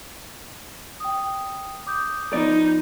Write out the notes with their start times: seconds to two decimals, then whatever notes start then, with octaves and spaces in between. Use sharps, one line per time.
1.00 G5 D#6
1.87 D6 D#6 G6
2.33 F3 B3 D#4 D5